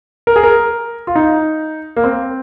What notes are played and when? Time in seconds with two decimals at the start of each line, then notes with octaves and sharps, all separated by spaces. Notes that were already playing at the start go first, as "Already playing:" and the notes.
0.27 A#4
0.36 G#4
0.43 A#4
1.07 F4
1.15 D#4
1.96 A#3
2.04 C4